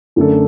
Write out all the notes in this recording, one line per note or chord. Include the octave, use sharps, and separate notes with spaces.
F#2 D3 A3 D4 A4